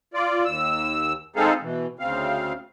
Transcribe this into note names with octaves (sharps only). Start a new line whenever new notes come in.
F4 D5
D#2 E6
G#3 C4 D#4 G#4 A4 F5
B2 E3
D2 C#3 C4 F5